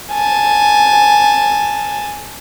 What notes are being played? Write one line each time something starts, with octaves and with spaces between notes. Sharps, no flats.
G#5 A5